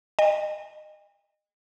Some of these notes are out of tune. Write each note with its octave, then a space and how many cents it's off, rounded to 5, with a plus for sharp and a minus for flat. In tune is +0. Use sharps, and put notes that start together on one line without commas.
D#5 -25 G5 +45